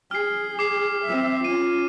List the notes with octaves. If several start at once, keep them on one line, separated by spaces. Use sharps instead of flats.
G#4 F6 C7
D6 C7
C4 E5
C#4 F4 D#7